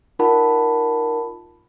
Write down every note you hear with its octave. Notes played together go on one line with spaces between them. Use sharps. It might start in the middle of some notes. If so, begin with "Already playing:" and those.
D#4 F4 A#4 F#5 A5 B5